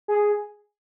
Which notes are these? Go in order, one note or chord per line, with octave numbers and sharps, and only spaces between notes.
G#4